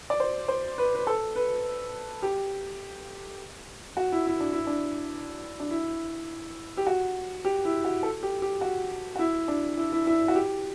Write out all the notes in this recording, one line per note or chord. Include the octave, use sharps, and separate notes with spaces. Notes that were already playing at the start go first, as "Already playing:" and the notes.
D5
C5
C5
B4
B4
A4
B4
G4
F#4
E4
E4
D4
E4
D4
D4
E4
G4
F#4
G4
E4
F#4
A4
G4
G4
F#4
F#4
E4
D4
E4
E4
E4
F#4
G4